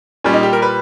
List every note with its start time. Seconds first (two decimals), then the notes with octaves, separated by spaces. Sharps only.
0.24 A#2 G3 C#4
0.33 D#4
0.43 G4
0.53 A#4
0.62 B4